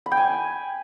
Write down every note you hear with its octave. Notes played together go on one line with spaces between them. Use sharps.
B5
G5
G#5